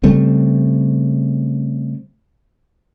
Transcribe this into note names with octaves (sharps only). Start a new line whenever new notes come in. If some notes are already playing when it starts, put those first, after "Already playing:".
C#3 G3 A3 C4